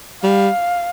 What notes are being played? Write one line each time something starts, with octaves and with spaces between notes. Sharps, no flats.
G3 F5